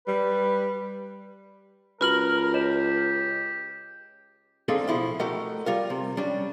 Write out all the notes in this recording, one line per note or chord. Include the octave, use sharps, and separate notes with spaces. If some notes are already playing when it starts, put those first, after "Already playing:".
G3 B4
C#2 F#4 A#4 B4 B5 F6 F#7
G4 C#5 D#5 E7
A#3 C4 D4 D#4 G#4 A4
B2 F3 E4 C6
A3 F#4 G4 A#4 D#5 F#5
G3 F4 A#4
C3
G3 C#4 D4